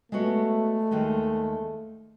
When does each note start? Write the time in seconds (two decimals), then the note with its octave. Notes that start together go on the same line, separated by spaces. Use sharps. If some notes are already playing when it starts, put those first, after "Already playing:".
0.12 G#3 A3 B3 F#4 C#5
0.91 D#2 D#3 G#3